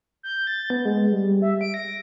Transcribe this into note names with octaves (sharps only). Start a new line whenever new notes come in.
G6
A6
B3
G#3
G3
E5
D7
A#6